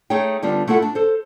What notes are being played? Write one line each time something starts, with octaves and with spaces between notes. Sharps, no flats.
A3 D#4 G#4 C#5 G5
D3 G3 B3 D4 F4
A3 E4 F4 A4 F#5
D4
A4 C5